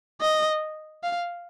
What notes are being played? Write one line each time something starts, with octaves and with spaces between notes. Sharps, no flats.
D#5
F5